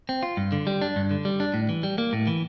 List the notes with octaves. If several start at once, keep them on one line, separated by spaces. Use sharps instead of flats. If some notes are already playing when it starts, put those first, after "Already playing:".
C4
F4
G2
D3
G3
D4
G2
D3
G3
D4
A2
E3
G3
A#3
A2
E3